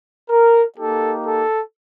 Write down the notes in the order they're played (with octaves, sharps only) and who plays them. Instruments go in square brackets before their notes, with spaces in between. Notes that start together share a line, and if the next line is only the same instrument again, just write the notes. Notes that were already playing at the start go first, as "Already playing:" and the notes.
[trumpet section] A#4
A#3 D#4 G4 A4
A4